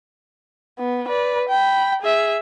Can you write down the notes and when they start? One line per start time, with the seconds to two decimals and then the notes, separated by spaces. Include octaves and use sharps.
0.79 B3
1.08 B4 D5
1.49 G5 B5
2.02 G#4 E5